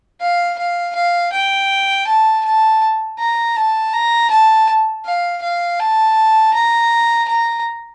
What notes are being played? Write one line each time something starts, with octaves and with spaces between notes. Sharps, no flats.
F5
F5
F5
G5
A5
A5
A#5
A5
A#5
A5
F5
F5
A5
A#5
A#5